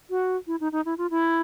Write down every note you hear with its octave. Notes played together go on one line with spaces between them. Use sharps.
F#4
E4
D#4
D#4
E4
F4
E4